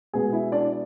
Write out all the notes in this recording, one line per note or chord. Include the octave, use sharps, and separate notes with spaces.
B2 G#3 B3 G#4 G#5
E4 E5
D4 D5